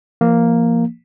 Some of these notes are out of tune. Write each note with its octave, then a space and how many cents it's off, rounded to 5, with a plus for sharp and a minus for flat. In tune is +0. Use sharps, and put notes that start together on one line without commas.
F3 -35 A#3 +0